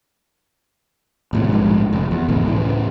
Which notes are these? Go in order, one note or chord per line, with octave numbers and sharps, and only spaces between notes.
D#1 A2 C3
A#1 G#2
F1
E2
E1 C#2 A2 E3
A2 C#3 E3